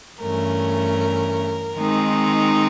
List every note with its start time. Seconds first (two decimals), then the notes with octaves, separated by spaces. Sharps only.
0.20 G2 E3 A3 C#4 A#4
1.76 D#3 G#3 C4 D#4